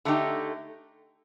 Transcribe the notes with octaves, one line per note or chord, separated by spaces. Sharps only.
D3 A3 D#4 G4